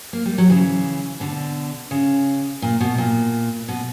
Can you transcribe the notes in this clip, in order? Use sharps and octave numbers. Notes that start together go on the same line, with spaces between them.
A#3
G3
F#3
C#3 E3
B2 D3
C#3
A#2
B2
A#2
B2